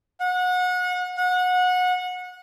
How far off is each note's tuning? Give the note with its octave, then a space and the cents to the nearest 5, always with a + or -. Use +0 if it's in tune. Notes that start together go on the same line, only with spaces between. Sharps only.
F#5 -30
F#5 -25